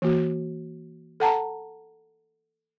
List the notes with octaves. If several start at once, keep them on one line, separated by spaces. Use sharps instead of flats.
E3 A#3 F#4
A4 F#5 A5 A#5